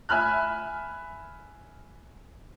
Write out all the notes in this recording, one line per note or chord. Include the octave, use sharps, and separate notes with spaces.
E5 G#5 B5 F6 F#6